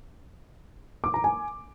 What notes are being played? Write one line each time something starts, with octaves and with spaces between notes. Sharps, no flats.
D6
A#5
G#5